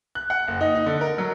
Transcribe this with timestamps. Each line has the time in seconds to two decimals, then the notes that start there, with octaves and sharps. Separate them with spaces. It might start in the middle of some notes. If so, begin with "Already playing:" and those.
0.15 F#6
0.30 F#5
0.48 F#1
0.61 D#4
0.75 D#4
0.86 D3
1.01 A#4
1.18 F#3